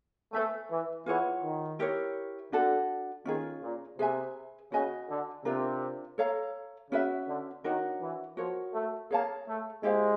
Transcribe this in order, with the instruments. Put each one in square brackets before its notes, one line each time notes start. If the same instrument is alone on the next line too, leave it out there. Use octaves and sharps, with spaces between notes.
[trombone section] A3 [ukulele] B4 E5 G#5
[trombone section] E3
[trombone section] E3 [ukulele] F4 G#4 C#5 F#5
[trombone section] D#3
[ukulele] E4 G4 A#4 C#5
[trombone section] D3 [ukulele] D4 F#4 A4
[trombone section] D#3 [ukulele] C#4 F4 G#4
[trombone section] A#2
[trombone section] C3 [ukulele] G#4 B4 E5 G#5
[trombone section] C#3 [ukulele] F#4 B4 D#5 G#5
[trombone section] D3
[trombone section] C3 [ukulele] D4 F4 A#4
[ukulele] A4 C#5 F5 A#5
[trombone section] C#3 [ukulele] C#4 F#4 B4 E5
[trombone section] D3
[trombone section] D#3 [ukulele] D4 F#4 A#4 C#5
[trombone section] E3
[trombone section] F3 [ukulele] F#4 A#4 C#5
[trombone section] A3
[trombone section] A#3 [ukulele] G#4 C#5 F5 A5
[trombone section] A3
[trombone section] G#3 [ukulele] E4 G4 C5 F5